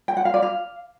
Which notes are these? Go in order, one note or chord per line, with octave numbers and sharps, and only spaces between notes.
G5
F#5
F5
D5
F5